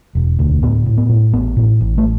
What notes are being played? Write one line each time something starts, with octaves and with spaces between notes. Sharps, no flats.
E1
D2
A2 B3
A2
B3
A2
A1 B3
A2
A1
A3